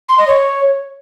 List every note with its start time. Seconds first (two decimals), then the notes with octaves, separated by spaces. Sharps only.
0.09 C6
0.18 D#5
0.27 C#5